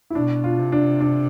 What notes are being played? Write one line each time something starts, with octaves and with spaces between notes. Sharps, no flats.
E4
B2 D4
F4
C3
D4
D4